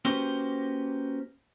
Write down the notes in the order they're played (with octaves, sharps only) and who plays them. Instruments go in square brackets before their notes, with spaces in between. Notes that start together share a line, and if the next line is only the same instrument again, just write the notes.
[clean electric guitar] A#3 C#4 F#4 G4 B4 C5